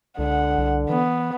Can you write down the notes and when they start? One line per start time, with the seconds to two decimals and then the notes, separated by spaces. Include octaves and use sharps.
0.19 C#2 D3 F#5
0.58 C2
0.90 E3 B3